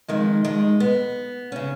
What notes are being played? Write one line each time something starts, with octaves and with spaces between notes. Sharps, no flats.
F2 D#3 G#3
G#3
B3
C#3 C#4